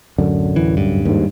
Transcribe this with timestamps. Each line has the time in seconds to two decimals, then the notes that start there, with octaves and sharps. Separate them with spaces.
0.18 D1 F#2 D3
0.56 E3
0.77 G2
1.05 D#2 G#2